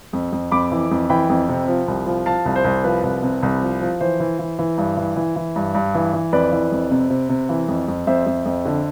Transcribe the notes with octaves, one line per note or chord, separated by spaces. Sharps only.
F2
F2
F2 B5 D6
E3
F2
E3 G5 B5
F2
C3
F3
C2
F3
F3 F5 A5
C2
C5
C2
F3 B4
C2
C3
C2
F3
F3
E3 C5
E3
E3
E3
G2
E3
E3
E3
G2
G2
E3
E3
F2 B4 D5
E3
F2
C3
C3
C3
E3
F2
F2
F2 C5 E5
F2
F2
D3